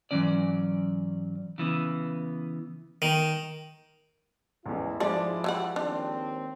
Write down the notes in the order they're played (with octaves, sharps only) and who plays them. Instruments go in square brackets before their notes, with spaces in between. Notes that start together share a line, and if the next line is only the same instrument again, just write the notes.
[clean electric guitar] G#2 E3 F#3 C#4 D5
C#3 E3 B3
[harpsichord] D#3
[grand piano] A1 E2 [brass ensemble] G#2 E4
[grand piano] F3 G#3 D5 [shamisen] D4
[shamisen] E3 G3 F#5
[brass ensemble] D#2 C4 [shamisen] D4